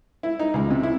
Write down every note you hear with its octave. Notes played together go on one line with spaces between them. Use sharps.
E4
D#4
C#2
C3
E4